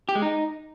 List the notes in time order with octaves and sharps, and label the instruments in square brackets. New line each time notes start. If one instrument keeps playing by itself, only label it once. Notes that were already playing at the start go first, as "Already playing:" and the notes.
[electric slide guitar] G4
G#3
D#4